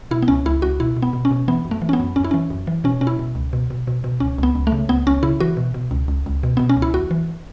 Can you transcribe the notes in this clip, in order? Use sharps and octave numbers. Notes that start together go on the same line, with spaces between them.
B2 E4
B3
C#2 C#4
C#2 E4
C#2 F#4
B2 E4
B2
B3
B2
C#4
B2
E3 B3
F#2
A3
E3
C#4
B3
F#2
F#2 C#4
E4
E3 C#4
F#2
E3
B2 C#4
B2 C#4
E4
B2
C#2
B2
B2
B2
B2
C#2 C#4
C#2 B3
C#2
A3
C#3
C#2 B3
C#2 C#4
C#3 E4
E3 F#4
B2
B2
C#2
C#2
C#2
B2
B2 B3
C#4
C#2
E4
E2 F#4
E3